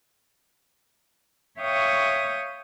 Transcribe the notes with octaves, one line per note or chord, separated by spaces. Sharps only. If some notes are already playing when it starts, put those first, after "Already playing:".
C#5 E5 F5 G5 C#6 D#6